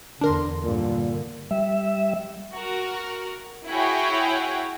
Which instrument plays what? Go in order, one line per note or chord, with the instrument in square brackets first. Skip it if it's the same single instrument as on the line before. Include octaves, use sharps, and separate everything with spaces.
[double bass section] E2 D3 [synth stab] D4 A#4 C6
[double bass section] G2 D3 [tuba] A#2
[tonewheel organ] G3 E5
[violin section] F#4 A#4
E4 F#4 G#4 C#5 G5